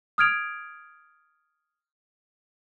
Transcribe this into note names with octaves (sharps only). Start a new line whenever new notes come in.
D#6 F6 G#6 D7 F7